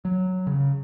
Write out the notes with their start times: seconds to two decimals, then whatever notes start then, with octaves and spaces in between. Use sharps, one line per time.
0.05 F#3
0.47 C#3